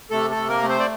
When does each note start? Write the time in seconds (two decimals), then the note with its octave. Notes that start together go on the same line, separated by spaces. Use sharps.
0.11 C3 A3 A4
0.30 A3 A4
0.36 C3
0.49 A#3 A#4
0.62 A3
0.68 C4 C5
0.80 D5